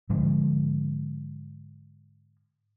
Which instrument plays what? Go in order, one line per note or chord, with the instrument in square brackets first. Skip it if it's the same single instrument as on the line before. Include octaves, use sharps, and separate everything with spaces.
[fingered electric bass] G#2 D3 F3 G#3